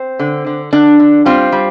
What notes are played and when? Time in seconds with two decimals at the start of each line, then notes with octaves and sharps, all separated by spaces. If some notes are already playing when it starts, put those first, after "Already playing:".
Already playing: C4
0.19 D3
0.47 D3
0.73 D3 D4
1.00 D3
1.25 G3 C4 F4
1.52 G3